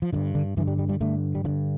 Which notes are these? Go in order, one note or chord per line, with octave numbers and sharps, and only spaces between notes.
F3
G2 D3 E3
D3
G2 D3 E3
G3
G3
G3
G2 D3 A3
G3
G2 D3 F3